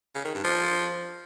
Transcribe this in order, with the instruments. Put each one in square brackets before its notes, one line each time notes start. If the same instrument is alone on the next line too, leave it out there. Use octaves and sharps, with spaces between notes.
[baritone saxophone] C#3
D#3
G2
F3